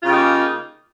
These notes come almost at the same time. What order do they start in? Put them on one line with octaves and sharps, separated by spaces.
F4 C#3 G4 D#4 A#3